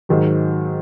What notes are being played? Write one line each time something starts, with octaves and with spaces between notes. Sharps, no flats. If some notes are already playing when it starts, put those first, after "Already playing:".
G#2 D#3 F#3